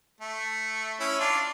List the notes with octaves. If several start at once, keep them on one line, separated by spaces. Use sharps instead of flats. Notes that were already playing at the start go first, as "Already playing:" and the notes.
A3
C#4 E4
D4 F4